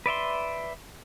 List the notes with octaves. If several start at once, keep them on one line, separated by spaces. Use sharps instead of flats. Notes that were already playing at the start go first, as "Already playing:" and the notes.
B4 D5 E5 C6